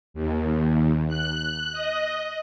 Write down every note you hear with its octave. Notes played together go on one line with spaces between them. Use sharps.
D#2
F#6
D#5